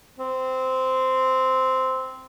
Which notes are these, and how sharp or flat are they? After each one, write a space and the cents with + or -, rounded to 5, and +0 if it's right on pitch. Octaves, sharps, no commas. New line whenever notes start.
C4 -10